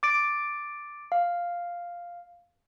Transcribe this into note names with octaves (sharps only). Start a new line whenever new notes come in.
D6 A6 D7
F5